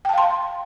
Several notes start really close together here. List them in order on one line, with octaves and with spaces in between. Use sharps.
G5 A5 F5 C6